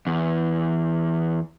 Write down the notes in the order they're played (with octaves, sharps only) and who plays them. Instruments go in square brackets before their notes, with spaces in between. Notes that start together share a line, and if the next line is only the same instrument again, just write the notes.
[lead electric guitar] E2